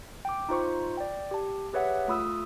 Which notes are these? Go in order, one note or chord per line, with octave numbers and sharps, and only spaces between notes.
G5 D6
D#4 F4 C5 C#6
D5 G5
G4 A5
G4 G#4 B4 C#5 E5 F#5
A3 F4 B5 D#6 E6